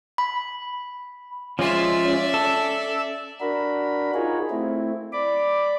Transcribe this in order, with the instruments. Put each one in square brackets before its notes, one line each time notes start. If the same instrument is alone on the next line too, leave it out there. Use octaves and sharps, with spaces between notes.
[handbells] B5
[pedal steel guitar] F3 G#3 F4 [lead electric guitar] C#4 [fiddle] D5 E5
[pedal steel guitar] A4
[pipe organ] D4 F#4 A#4 B5
D#4 F4 F#4 G#4 A#4 C#5
A3 C4 E4
D5 B5 D6